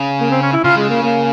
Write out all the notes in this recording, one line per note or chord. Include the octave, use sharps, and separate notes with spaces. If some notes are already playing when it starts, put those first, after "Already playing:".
Already playing: C#3
A#3
C4
C#4
E4
C#3 F4
G#3
A#3
A#3